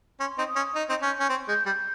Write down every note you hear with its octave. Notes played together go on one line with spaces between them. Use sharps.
C#4 C6
C4 D#4
D#6
C#4
D#4
C4 D#4
C#4 G6
C#4
C4
G#3 G6
G3 G6